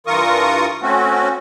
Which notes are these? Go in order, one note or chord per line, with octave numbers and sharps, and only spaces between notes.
G2 E3 F4 A#4 C#6 D#6
A3 C4 C#4 F#4